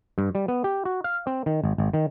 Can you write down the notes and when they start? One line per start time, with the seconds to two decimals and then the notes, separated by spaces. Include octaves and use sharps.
0.18 G2
0.35 G3
0.48 B3
0.64 G4
0.85 F#4
1.04 F5
1.27 C4
1.46 D#3
1.64 G#1
1.78 G#1
1.94 D#3